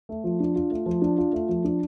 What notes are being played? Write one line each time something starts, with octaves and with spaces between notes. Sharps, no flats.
A3
F3
D4
F4
A3
F3
D4
F4
A3
F3
D4